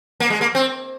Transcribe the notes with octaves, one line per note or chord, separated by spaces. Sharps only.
A#3
G#3
A#3
C4